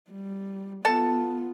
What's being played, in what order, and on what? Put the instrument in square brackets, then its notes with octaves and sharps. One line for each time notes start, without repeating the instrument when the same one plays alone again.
[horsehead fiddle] G3
[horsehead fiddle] B3 F4 [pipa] A4 A5